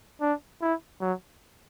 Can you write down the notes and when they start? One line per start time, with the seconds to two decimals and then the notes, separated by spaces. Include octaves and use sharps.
0.21 D4
0.62 E4
1.01 F#3